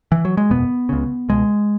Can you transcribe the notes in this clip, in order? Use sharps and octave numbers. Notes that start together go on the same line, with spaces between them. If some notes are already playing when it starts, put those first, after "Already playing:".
E3
F#3
G#3
F#1 E2 B2 B3
C#2 C#3
C#2 B2 G#3